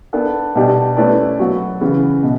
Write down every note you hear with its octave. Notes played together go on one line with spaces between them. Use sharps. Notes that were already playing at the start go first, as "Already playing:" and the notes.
B3 D4 A4 D5
B2 G3 D4 G4 D5
A3 C#4 E4 B4 D5
F#3 B3 F#4
C#3 E3 B3
B2